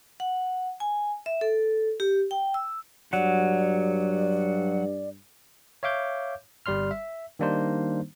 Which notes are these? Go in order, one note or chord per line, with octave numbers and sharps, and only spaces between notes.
F#5
G#5
E5
A4
G4
G5
E6
G2 F#3 D5 F#5
C#5 E5 F5 D6 G6
G1 G3 D5 C6 F6
E5
D#3 G3 A#3 D4 D#4 C5